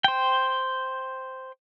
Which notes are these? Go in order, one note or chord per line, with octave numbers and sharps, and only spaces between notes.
C5 G5